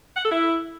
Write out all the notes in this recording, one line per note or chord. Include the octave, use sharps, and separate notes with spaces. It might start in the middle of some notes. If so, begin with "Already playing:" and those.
F#5
A4
E4